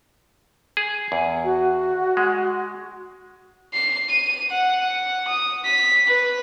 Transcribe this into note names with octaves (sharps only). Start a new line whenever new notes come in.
G#4
E2
F#4
G#3
C7
D#7
F#5
D#6
B6
B4